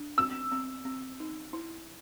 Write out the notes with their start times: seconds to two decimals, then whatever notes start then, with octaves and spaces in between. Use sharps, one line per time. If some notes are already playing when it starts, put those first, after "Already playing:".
Already playing: D4
0.18 C4 E6
0.52 C4
0.85 C4
1.20 D#4
1.53 E4